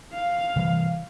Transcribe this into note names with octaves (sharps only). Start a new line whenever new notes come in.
F5
C3 E3 G3